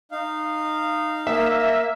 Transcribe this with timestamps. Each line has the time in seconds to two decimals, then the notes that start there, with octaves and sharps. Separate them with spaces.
0.11 D#4 F5
1.27 A#3 E5